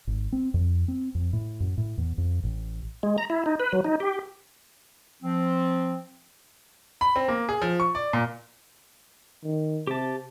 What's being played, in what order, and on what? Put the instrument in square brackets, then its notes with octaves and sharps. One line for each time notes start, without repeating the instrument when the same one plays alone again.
[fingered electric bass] G#1
C4
F2
C4
F2
A2
F#2
A2
E2
F2
A1
[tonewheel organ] G#3
A#5
E4
D#4
B4
F#3
D#4
G4
[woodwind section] F3 C4
[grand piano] B5
C4
A#3
G#4
F3
C#6
D5
A#2
[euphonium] D#3
[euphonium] C3 [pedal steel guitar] G4 A5